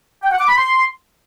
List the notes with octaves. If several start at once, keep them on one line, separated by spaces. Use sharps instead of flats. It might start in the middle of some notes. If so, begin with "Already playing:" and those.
G5
F#5
D6
B5
C6